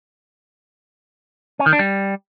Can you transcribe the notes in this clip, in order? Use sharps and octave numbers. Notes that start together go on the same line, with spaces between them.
C#4
D#3
D4
G3